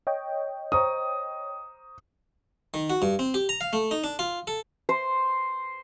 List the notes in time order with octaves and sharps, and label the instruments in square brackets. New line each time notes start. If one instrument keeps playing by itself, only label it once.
[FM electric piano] C#5 D#5 G5
[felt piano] C5 A#5 C#6 [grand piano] D#6
[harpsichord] D#3
F#4
G2
C4
G4
A#5
F5
A3
D#4
D4
F4
A4
[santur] C5